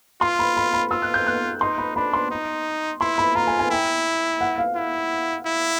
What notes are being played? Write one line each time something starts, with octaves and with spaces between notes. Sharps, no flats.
F4 C6
B5
B5
B5
F4 E6
F#6
G6
F#6
D#4 C6
B5
D4 B5
C6
D#4
E4 C6
B5
F4 A#5
G#5
G#5
E4 G5
F#5
F5
E4
E4